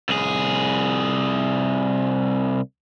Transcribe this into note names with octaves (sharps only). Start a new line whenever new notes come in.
C2 G#4